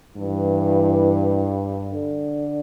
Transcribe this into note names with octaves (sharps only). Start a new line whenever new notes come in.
G2 E3
D3